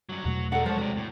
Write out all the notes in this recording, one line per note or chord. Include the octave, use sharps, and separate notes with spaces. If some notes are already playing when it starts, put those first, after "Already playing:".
G2 F#3
E2 B2 F#3 A3
D4 A4 A#4 F#5
F3 G#3 B3 C#5 A5
C3 F#4 D5
A2